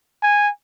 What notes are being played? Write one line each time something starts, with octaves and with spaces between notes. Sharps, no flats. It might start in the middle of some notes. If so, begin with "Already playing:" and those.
G#5